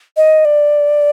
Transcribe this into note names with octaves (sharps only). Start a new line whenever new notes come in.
D#5
D5